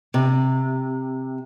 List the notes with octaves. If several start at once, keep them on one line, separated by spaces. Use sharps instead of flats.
C3